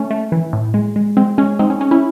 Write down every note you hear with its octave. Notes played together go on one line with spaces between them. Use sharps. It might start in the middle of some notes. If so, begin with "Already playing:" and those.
Already playing: A3 C#4
A3
E3
A2
G#3
G#3
G#3 C4
G#3 C#4
G#3 C4 D#4
C#4
G#3 C#4
C#4 E4